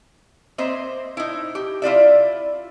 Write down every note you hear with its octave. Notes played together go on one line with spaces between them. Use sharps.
A#3 C4 C5 D#5 E5
D#4 E4
G4
E4 F4 D5 E5